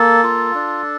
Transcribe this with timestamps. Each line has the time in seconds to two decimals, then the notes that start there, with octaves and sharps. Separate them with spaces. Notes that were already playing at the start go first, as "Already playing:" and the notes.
Already playing: A#3 A4
0.23 F4
0.55 D4